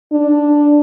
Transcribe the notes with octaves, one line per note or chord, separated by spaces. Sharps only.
D4